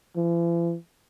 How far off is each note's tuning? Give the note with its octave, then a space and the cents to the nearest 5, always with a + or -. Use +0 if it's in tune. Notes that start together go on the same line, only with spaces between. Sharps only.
E3 +45